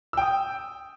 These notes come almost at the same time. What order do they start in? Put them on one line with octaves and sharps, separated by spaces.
E6 G5 D#6